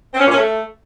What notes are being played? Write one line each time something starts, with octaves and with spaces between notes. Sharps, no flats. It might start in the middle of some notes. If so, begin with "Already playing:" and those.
C4
C#4
A#2
C#4
A3